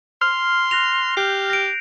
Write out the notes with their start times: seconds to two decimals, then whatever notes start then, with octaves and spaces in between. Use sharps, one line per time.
0.22 C6 F6
0.71 F#6 A#6 F7
1.17 G4 G6 C7
1.50 A#6 D7